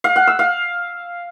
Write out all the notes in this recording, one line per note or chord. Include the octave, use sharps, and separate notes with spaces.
F5
F#5
E6
F5